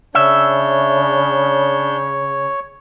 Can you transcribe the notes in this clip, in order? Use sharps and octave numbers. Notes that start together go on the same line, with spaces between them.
C#3 D4 C#5 E5 G6